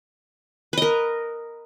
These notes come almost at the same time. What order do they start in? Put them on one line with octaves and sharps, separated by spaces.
B4 D#5 A#4